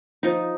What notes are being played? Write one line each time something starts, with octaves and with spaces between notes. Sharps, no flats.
F3 D#4